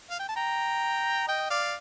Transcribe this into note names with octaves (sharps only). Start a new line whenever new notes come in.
F5
G5
A5
G5 A#5
D#5 G5
D5 F5